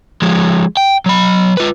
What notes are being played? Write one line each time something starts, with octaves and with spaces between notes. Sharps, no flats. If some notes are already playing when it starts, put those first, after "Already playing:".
F3 G#3
G5
F#3 B5
F4 B4